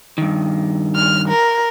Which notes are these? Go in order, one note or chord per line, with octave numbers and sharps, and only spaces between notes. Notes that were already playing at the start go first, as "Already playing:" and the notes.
G2 D#3
F6
A#4